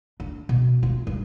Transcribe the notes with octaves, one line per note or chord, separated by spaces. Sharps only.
D4
B2
F4
G2